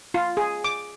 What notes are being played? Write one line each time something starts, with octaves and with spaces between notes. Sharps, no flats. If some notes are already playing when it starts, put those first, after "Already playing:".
F4
G#4
D6